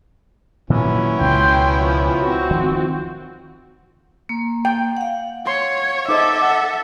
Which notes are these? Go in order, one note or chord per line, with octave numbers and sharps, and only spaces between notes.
A#2 D#3 F#3 B3 C#4 E4
C#2 B2 G5 C6
F3
C4 F#4
D#3 F3
A#3
G5
F5 F#5
C#5 C6
D#4 A4 C5 D#5 E5 D6
F#5